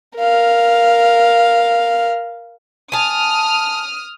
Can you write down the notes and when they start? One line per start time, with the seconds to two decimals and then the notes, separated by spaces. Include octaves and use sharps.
0.18 A#4 F5
2.92 G#5 A5 D#6 F6